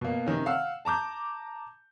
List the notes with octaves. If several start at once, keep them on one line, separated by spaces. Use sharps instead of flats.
B2 A#3
C3 D#3 C#4
F5 F#5 E6
A5 A#5 D6 G6